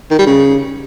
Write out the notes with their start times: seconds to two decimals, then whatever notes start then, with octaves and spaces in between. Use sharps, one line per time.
0.11 D#3
0.19 G3
0.27 C#3